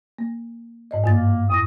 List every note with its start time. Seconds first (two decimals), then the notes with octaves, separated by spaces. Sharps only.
0.19 A#3
0.91 G#2 D5 D#5
1.04 G2 A#3 F4 A6
1.50 F#2 C#6 D#6 A#6